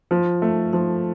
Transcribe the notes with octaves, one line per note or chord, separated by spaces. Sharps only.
F3
A3
F3